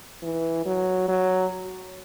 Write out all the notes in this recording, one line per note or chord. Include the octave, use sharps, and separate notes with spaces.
E3
F#3
F#3